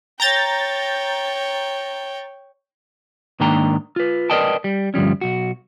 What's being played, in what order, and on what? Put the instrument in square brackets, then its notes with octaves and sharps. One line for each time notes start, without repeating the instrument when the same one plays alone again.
[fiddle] C#5 G5 [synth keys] A#5 G6 A6
[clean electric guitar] G#2 D#3 A#3 D4 G5 A#5
F4 B4
A#4 B4 D5 D#5 G5 A5
G3
D2 G2 F3 G3 C#4
B1 F#4